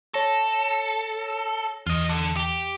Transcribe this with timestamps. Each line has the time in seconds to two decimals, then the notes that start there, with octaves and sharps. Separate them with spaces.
0.14 A4 C#5 A#6
1.87 E2 F4 D#5
2.09 D3
2.36 G4